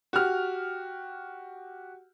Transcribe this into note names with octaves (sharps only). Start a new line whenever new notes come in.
F#4 G4 F6